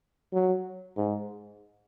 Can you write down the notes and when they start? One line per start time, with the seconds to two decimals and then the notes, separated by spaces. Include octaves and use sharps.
0.33 F#3
0.97 G#2